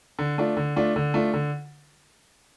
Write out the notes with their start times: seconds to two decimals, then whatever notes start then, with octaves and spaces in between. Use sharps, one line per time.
0.19 D3
0.38 A3 D4 F4
0.57 D3
0.76 A3 D4 F4
0.96 D3
1.14 A3 D4 F4
1.34 D3